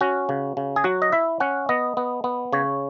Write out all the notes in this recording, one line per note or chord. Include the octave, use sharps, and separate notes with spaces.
C#4 F#4
C#3
C#3
G#4
F#3 F#4
D#5
E4 E5
C#4 F#5
B3 D#5
B3
B3
C#3 C#5